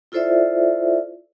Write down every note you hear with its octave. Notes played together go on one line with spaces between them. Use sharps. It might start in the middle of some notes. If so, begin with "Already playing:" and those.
E4 F4 A4 C5 D5 E5